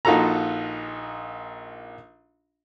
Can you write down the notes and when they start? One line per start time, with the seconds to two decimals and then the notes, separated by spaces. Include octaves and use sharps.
0.05 A#1 D#4 F4 F#4 A4 A#5